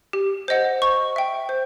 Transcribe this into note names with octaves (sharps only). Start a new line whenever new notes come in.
G4
C5 D#5 F#5
C5 C#6
E5 G5
C5